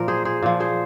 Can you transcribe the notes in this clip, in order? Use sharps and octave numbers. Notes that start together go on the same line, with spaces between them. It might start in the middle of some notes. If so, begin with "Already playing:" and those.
Already playing: A#2 F3 A#4
G#4 C5
G#4 C5
A#2 F3
G#4 C5